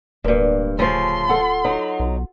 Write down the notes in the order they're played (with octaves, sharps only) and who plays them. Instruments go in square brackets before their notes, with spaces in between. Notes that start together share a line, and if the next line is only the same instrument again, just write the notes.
[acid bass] D1 [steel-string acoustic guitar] E2 G2 [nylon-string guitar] A#3
[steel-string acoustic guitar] C#3 F3 [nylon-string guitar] A3 F4 G#5 [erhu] C6
[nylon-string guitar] F4 A4 F#5
[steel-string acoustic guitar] F#3 D#4
[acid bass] B1